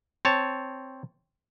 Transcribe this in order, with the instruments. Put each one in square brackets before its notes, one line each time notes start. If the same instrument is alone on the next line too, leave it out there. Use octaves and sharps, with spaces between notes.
[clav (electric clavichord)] C4 C#5 A5